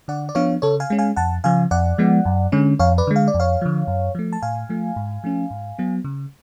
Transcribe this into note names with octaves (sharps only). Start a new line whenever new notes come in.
D3 D5 F#5
D5
F3 B3 D4 C#5 F5
C#3 A4 C#5
F5 G#5
G#3 C#4
F5 G#5
F2 F#5 A5
C#3 F3 F5 G#5
F2 D5 F#5
F3 G#3 B3
F#2
D3 G#3 C#4
F2 C#5 F5
B4 D5
D3 G#3
F5
D5
F2
C#5 F5
D3 F3
F#2
F3 A3
A5
A2 F5 G#5
F3 A3
G#2
F3 A3 C#4
G#2
F#3 B3
C#3